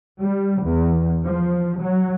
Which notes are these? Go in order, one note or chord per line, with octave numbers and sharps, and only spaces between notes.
G3
E2
F3
F#3